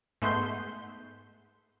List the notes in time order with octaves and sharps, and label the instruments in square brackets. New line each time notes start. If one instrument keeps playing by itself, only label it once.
[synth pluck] G#2 A3 B3 C6 G6